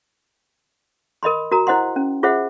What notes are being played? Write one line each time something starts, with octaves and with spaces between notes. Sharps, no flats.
A#4 D#5 B5 C6
F#4 A#4 A#5
E4 C5 D#5 F#5 C6
C#4
F4 G#4 C5 E5 F#5